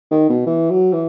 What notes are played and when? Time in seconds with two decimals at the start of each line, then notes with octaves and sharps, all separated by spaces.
0.11 D#3
0.29 B2
0.47 E3
0.70 F#3
0.93 E3